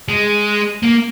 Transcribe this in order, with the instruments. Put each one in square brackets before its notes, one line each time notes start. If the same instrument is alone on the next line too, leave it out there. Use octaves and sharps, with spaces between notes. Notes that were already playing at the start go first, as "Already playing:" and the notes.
[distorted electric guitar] G#3
A#3